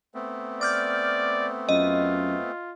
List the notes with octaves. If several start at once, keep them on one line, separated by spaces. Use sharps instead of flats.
A3 B3 C4
D5 D6 F6 G6
F#2 F4 D#5